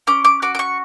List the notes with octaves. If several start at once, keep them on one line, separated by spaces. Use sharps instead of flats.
C#4 D6
D6
F#4 D6
D6
C#6